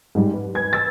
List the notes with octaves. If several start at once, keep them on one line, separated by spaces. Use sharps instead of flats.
G#2 G3
B4
B4 G#5 G#6
E6 A6